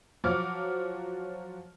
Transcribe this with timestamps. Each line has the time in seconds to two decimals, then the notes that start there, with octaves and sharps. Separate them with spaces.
0.24 F3 F#3 F#4 D6 F6